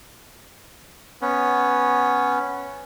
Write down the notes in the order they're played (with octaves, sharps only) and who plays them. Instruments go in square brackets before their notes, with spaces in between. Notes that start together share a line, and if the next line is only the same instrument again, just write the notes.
[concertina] B3 C#4